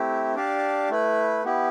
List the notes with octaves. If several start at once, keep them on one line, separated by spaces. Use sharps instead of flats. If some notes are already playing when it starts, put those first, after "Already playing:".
Already playing: A3 C4 E4 G4
D4 G4 D5 F5 A5
A3 E4 B4
B3 E4 G4